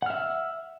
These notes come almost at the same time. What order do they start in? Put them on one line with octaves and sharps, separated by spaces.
F#5 F6 E5 E6